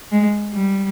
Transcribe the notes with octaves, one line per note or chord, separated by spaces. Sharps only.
G#3
G3